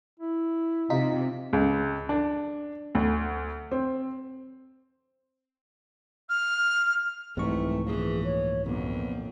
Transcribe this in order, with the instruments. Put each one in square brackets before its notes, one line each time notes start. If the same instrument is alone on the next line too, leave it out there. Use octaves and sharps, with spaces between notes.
[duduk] E4
[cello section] C3 [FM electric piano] D#4 F4 B6
[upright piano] C#2
D4
D2
C4
[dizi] F6
[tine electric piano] C2 G#2 C#6 [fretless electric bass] F2 C3 [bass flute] E3 [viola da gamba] A3
[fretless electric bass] A#2 F3 [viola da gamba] E3 [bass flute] G#4
[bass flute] C#5
[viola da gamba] F2 [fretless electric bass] A#2 D3 F#3 [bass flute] B3